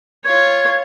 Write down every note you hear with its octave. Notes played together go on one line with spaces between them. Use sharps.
F4 C#5 G#6